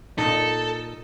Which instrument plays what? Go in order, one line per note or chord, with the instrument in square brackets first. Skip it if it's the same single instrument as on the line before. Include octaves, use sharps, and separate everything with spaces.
[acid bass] A#2 [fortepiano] D#4 [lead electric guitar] A4